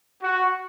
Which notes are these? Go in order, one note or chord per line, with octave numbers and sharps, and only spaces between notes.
F#4